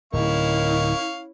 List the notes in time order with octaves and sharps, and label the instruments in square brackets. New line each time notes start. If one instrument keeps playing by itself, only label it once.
[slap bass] D1 [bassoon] D#3 [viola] C#4 E4 [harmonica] F5 C#6